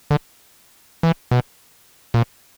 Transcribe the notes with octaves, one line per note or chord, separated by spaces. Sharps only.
D3
E3
B2
A#2